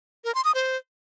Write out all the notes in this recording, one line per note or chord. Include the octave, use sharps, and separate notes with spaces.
A#4
C6
D#6
C5